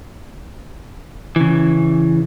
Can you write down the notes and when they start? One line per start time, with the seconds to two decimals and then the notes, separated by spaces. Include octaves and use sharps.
1.36 C#3 E3